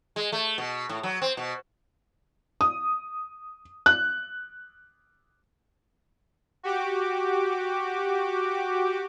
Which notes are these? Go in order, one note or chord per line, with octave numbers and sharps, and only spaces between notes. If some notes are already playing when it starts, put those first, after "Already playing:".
G#3
A3
B2
A2
F#3
C4
B2
D#6
F#6
F#4 G4 D6